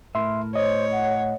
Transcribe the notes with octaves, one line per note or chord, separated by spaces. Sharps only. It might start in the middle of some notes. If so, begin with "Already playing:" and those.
A2 A#4 E5 C6
C5 C#5 D#5
F#5